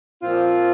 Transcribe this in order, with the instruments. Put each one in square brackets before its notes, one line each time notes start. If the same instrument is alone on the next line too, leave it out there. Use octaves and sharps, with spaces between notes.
[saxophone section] A#2 F3 C4 F4